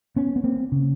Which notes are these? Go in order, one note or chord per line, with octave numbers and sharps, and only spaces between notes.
B3 C#4
B3
A#3 C4
C#3